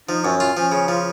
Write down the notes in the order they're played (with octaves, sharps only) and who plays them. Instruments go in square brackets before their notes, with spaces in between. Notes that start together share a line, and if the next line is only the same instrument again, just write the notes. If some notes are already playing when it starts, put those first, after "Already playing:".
[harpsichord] F3 [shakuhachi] D#4
[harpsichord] F#2 [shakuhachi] C#4
[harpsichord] F4
[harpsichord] F3 [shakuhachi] C#4
[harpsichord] C#3
[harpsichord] F3 [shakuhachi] F4